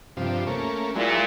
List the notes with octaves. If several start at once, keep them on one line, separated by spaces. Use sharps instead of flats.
G2 C3 F3
A3 A#3 C#4
A#2 F#3 G#3 E4